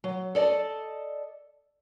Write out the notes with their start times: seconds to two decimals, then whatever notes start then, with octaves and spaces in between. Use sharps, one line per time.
0.04 F#3
0.35 A4 D5 D#5 A5